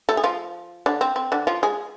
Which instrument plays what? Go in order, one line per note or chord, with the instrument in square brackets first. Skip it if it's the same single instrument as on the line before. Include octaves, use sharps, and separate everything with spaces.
[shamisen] A3 A4
G#4
F3 F4
D3 D4
C4
C4
D3 D4
F3 F4
G#3 G#4